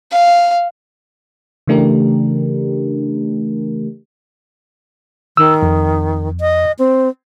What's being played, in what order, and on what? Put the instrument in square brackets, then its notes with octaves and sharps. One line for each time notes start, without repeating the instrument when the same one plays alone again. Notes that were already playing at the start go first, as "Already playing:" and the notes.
[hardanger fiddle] F5
[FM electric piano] C#3 E3 A3 D4 G4 A#4
[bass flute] D#3 [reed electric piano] E6
[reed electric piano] F2
[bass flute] D#5
C4